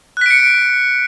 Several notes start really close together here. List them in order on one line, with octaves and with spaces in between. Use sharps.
F#6 B6 D7 C#7